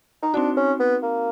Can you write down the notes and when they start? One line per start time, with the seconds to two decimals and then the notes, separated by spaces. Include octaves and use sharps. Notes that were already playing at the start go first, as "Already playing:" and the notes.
0.23 D#4
0.34 C4 D4 D#4 F#4
0.57 C#4
0.80 B3
1.03 A#3